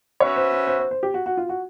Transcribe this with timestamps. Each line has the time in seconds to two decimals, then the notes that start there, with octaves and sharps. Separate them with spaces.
0.20 C#4 F#4 B4 C#5 E5
0.36 C5
0.52 C5
0.67 C5
0.79 C5
0.91 C5
1.03 G4
1.14 F#4
1.26 F#4
1.37 F4
1.49 F#4